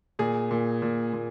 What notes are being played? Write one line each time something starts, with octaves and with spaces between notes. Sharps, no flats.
A#2 G#4
A#2
A#2
A#2